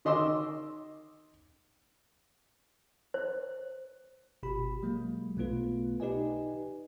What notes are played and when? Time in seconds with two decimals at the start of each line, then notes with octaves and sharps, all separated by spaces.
0.05 D#3 D#5 C6 D6 E6
3.14 C5
4.43 G1 B2 G4 B5
4.83 F#3 G#3 A#3
5.36 B1 B2 A3 B3 F4 B4
6.00 D#4 G4 B4 D5 D#5 G#5